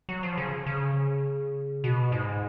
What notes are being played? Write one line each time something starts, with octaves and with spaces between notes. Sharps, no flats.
F#3
F3
C#3
C#3
B2
G#2